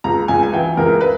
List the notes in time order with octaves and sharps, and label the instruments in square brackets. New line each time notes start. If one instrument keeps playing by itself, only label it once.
[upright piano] C#2 A#5
C#2 G#5
G#5
E3 G5
C#2 A#4
B4